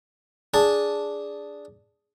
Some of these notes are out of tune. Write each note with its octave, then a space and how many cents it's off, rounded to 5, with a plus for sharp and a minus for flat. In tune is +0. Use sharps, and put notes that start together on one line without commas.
D4 -5 G#4 +0 A5 +0